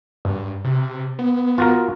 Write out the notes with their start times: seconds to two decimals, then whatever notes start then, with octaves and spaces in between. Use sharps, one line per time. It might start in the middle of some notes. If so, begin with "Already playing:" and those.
0.25 G2
0.64 C3
1.19 B3
1.58 F4 F#4 A#4